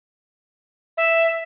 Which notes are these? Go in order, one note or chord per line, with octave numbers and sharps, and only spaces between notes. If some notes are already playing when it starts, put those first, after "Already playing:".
E5